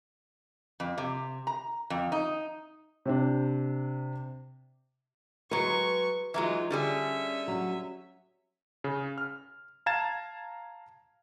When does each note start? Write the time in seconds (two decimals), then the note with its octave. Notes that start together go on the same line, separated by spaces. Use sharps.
0.80 F2
0.98 C3
1.47 A#5
1.90 F2
2.12 D#4
3.05 C3 C4 D4
5.51 F#3 G#3 B4 C#6
6.34 E3 F#3 G#3 D#4 F4
6.70 D3 G3 C#4 G#4 E5
7.48 F#3
8.84 C#3
9.18 F6
9.86 F5 A5 A#5 G#6 A6 E7